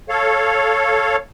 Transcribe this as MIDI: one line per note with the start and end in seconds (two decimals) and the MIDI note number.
0.09 1.16 69
0.09 1.16 73
0.09 1.16 77